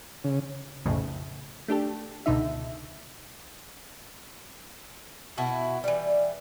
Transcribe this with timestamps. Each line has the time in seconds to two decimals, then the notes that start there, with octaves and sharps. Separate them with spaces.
0.24 C#3
0.86 B1 F2 A2 C#3
1.68 A3 D4 G4 A4
2.26 C#2 B2 D3 D#4 E5
5.37 B2 E4 F#4
5.84 E3 G3